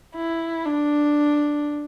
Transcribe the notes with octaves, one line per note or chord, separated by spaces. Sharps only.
E4
D4